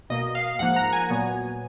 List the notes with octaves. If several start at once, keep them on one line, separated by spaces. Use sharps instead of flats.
B2 A#3 D#5
F5
G#2 F3 A#3 F#5
A#5
G#5
A#2 F#3 B3